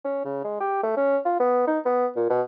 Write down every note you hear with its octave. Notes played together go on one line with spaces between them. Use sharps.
C#4
C#3
G#3
G4
A3
C#4
F4
B3
D#4
B3
A#2
B2